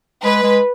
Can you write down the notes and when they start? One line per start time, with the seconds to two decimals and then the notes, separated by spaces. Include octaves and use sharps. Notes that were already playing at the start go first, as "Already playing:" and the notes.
0.24 G#3 B4
0.43 G#3